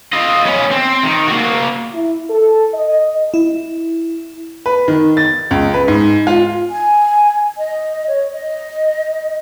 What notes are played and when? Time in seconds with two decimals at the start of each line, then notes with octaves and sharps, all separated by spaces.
0.13 F4 D#5
0.45 B3 C#4
0.71 C4
1.03 D#3
1.27 A#3 F#4
1.93 E4
2.30 A4
2.74 D#5
3.34 E4
4.66 B4
4.88 D#3
5.17 A6
5.51 C#2
5.74 B4
5.88 G#2
6.27 F4
6.69 G#5
7.58 D#5
8.07 C#5
8.31 D#5